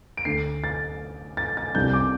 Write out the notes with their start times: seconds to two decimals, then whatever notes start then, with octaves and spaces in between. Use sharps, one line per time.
0.17 D7
0.25 D2 D3 A3 C7
0.64 A6
1.37 A6
1.57 A6
1.75 C2 C3 G3 D4 G6
1.93 D6